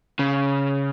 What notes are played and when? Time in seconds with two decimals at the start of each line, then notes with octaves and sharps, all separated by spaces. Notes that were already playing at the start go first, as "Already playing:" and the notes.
0.19 C#3